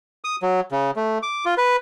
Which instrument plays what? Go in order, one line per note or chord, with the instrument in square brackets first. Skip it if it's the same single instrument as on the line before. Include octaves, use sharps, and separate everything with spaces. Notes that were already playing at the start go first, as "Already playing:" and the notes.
[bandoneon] D#6
F#3
C#3
A3
D6
F4
B4